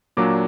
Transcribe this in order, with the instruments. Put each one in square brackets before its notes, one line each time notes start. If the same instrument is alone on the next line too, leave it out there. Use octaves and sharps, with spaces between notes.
[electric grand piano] A#2 F#3 A#3 D4 D6